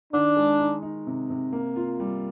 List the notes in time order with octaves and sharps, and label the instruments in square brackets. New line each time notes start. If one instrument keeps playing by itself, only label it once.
[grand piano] D#3 [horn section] D4
[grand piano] G#3
D#4
D#4
C3
C3
A#3
F4
G3